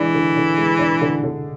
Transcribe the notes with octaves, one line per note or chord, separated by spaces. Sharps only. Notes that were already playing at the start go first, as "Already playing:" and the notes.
Already playing: E3 G#3 D4
D3
D3
G#3
D4
D3
D3